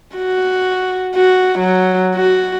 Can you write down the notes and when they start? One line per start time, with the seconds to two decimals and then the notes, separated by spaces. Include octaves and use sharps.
0.16 F#4
1.15 F#4
1.59 F#3
2.15 F#4